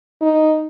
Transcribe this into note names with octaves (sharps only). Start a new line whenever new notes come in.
D#4